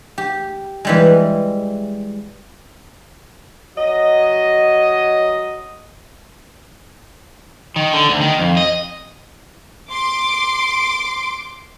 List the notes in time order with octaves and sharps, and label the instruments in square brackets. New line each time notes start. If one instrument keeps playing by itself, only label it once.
[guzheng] G4
E3 G3 G#3
[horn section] F#3 D#5
[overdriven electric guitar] D#3
D3
D2
D#3
F2
D#5
[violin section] C6 D6 D7